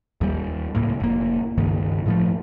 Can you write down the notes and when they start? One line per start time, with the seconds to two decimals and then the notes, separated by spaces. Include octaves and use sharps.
0.21 D#2 G3
0.75 C#2 A2 A#3
1.00 F1 A#3
1.58 C#2 G2 D#3
2.06 A2 F3 A3